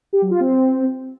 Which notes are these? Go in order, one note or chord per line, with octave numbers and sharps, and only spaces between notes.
G4
F#3
F4
C4